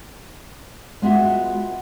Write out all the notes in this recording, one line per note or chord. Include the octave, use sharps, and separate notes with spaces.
G#3 B3 F4 F#4 E5